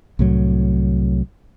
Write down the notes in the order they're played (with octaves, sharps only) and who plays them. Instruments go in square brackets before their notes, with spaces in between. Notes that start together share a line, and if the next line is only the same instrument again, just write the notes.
[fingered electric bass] C2 A2 F#3